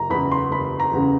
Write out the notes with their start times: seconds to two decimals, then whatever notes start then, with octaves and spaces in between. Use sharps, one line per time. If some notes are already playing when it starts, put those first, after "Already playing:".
Already playing: F#1 A#5
0.10 E2 B5
0.14 C#3
0.32 C6
0.51 F#1 B5
0.80 A#5
0.93 E2 C#3